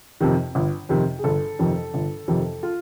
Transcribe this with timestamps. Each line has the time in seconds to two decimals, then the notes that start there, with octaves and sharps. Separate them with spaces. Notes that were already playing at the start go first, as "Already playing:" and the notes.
0.21 F2 C3 D#3
0.55 G1
0.89 F2 C3 D#3
1.18 G#4
1.24 G1 A4
1.59 F2 C3 D#3
1.94 G1
2.28 F2 C3 D#3
2.63 F4